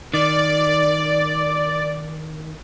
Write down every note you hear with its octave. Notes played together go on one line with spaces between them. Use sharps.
D#3 D5